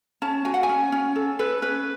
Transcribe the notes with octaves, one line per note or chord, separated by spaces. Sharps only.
C#4 A5
F#4 G#5
F#5
G#5
C#4
C#4
A4
A4 B4
C#4 B4